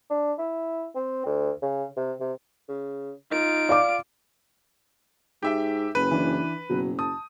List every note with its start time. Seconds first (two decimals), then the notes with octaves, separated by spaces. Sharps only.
0.10 D4
0.39 E4
0.95 C4
1.26 D2
1.62 C#3
1.97 C3
2.20 C3
2.69 C#3
3.31 D#4 F4 D7
3.69 D5 F5 D6
5.43 G#2 G4 E5 G5
5.95 F#1 B4
6.11 E3 D4
6.69 F#1 B2 F#3
6.99 A5 D#6